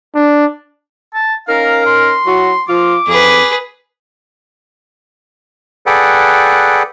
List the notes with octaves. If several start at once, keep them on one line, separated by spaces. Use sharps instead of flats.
D4
A5
C#4 D#4 A#4 F5
C6
F#3 E4 F#4
F3 F4 D6
F2 G#4 B4
G#4 A4 B4 D5 F#5 G5